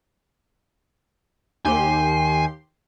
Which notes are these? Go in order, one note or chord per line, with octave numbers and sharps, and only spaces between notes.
D#2 G4 G#5 C6